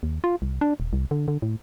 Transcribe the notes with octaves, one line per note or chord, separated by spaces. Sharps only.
D#2
F4
C2
D4
D#1
C2
D3
D3
A2